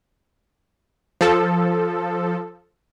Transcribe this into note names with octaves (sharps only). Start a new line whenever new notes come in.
F3 A4